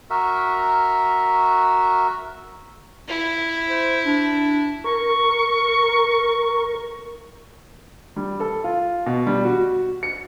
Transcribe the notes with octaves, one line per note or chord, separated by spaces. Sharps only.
F#4 A#4 E5
E4
C5
D4
A#4 C#6
G3
A4
F4
B2
G3
F#4
C#7